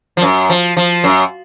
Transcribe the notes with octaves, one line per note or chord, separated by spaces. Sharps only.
F3
F#2
F3
F3
F#2